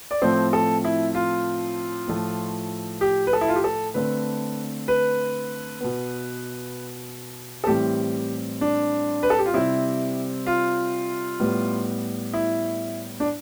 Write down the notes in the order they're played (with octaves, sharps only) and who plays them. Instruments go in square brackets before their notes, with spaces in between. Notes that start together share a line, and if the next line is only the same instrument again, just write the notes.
[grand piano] D5
A2 F3 A3 C4 C5
A4
E4
F4
A2 F3 A3
G4
B4
A4
E4
F4
G4
A4
D3 A3 C4 B4
B4
B2 B3
A4
A2 E3 G3 C4 G4
D4
B4
A4
G4
F4
C3 G3 C4 E4
F4
A2 G3 B3
E4
D4